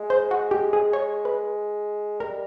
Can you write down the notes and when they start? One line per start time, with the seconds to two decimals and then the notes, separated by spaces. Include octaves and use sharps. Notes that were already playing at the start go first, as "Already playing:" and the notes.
Already playing: G#3
0.10 C5
0.31 F#4
0.51 G4
0.73 G#4
0.93 C#5
1.25 B4
2.20 G3 A#4